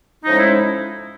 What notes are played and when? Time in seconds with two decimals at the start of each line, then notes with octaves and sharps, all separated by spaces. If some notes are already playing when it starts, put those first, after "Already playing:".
0.24 A2 F3 G#3 C#4 D#4
0.38 E4